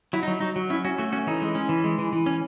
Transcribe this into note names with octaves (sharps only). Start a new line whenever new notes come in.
F#3 E4
D#4
F#3
F#3 D#4
F#3
C#4 E4
C#4 F#4
A3 F#4
C#4 F#4
E3 D#4
G#3
C#4
E3
G#3
E3
E3
C#4